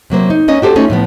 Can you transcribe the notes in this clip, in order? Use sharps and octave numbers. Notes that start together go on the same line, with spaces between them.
C3 F#3 A#3 C5
D#4
A#3 C#4 D#5
F#4 G4 A4 C5
A3 C#4 D#4 F4
A2 F3 B3